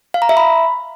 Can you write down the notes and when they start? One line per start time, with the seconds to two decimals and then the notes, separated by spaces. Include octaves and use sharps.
0.14 F5
0.22 A#5
0.29 E5
0.37 B5